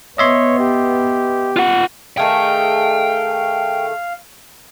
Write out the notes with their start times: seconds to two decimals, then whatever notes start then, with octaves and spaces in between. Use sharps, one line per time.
0.18 B3 C#5 D#5 E5 C6
0.59 G4
1.57 F4 F#5
2.17 D#3 A3 G#4 F5 G5